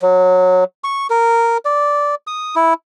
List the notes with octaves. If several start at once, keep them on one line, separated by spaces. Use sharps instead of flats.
F#3
C#6
A#4
D5
D#6
E4